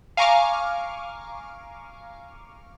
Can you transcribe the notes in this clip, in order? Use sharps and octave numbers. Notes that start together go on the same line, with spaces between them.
F5 G#5 A#5 C#6 D6 F6